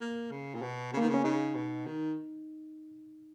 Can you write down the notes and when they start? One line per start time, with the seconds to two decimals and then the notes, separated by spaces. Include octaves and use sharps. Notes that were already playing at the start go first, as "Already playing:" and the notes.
0.01 A#3
0.31 C#3
0.54 A#2
0.62 B2
0.93 C#3
0.97 D#3 A#3
1.05 C#3 B3
1.14 C#4
1.24 C#3 D#4
1.55 B2
1.86 D#3